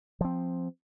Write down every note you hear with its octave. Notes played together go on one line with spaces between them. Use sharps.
F3 C4